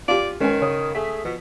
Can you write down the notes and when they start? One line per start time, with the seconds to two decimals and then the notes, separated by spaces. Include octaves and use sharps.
0.08 F4 G4 D5
0.40 D#3 G#3 C#4 B4 G#5
0.61 C#3 C#5 D#6
0.95 A3 G#4 B6
1.25 B2 F3